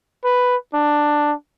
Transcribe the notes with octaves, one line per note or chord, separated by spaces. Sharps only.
B4
D4